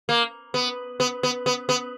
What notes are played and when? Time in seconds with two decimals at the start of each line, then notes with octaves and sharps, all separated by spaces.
0.09 A#3
0.54 B3
1.00 B3
1.23 B3
1.46 B3
1.69 B3